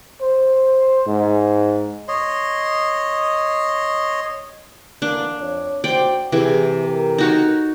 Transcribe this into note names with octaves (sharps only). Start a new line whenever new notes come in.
C5
G#2
C#5 D#5 C6
D3 E3 A#3 D4
F2 C#5
F#4 C5 D5 G5 C6
C3 E3 G#4
G4 A4 A#4
D#4 F#4 C#5